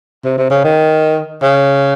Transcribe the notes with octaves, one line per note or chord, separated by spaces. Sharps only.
C3
C3
C#3
D#3
C#3